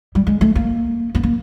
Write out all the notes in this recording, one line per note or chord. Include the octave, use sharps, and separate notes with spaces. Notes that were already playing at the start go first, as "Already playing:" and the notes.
G3
G#3
A3
A#3
B3
A#3